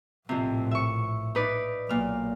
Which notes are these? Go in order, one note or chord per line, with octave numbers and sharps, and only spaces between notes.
A#1 F2 A2 C3
E5 C#6
D#4 B4 D5
B1 A#2 F6